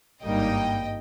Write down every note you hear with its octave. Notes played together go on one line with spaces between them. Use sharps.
G#1 G2 G3 A#3 D#4 D#5 G5